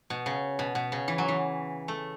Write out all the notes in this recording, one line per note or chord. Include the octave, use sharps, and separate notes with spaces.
B2
C#3
B2
B2
C#3
E3
F#3
E3
A3